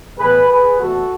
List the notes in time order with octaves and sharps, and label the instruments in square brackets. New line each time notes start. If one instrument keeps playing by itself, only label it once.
[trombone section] A2 E3 B3 G#4 B4
G#4 B4
E2 B2 A3 F#4 A4